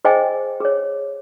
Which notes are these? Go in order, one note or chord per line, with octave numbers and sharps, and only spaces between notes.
G#4 C5 D#5 G5 G#5
G#4 C#5